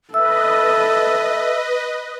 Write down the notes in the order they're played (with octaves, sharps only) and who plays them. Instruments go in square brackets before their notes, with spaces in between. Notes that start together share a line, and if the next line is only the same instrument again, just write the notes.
[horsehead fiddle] A4 [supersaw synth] B4 D#5 [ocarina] E5 [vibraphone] E6